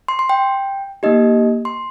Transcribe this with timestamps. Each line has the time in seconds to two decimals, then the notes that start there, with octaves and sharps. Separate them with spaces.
0.08 C6
0.19 C6
0.29 G5
1.03 A#3 D#4 G4 D#5
1.65 C6